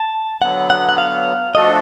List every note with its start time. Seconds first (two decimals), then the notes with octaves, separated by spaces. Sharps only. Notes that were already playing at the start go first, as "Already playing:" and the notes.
Already playing: A5
0.41 D3 F#3 B3 F#5
0.70 F#5
0.89 F#5
0.98 F5
1.55 F3 A3 D4 F#4 A4 D#5